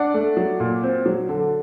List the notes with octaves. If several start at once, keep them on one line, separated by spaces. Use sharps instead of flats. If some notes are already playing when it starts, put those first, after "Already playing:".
Already playing: D4 D5 F#5
A3
F#3
A#2
C4
F#3
D3